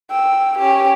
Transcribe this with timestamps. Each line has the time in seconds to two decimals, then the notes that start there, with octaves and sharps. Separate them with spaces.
0.10 G5 E6
0.59 C#4 G4